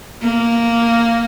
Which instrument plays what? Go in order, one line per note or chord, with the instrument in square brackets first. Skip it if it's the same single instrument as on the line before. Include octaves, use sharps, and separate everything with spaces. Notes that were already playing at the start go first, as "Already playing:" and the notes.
[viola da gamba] A#3